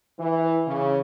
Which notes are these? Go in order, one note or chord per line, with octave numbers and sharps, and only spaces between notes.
E3
C#3